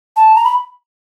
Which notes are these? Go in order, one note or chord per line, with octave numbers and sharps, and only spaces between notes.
A5
A#5
B5